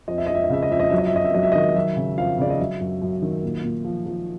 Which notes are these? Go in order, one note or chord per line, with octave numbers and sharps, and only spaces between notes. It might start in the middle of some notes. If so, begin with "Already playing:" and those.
F2 D#5
E5
F2 D#5
E5
D#5
C#3 E5
D#5
F2 E5
D#5
F#3 E5
D#5
E5
F#2 D#5
E5
F#3 D#5
E5
D#5
D#3
F#3 E5
C#3
F2 F5
C#3 D5
D#5
F#3 E5
F#2
F#2
D#3
A#2
A#2
F3
F3